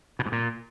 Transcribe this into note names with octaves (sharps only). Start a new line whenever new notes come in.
B2
G#2
A#2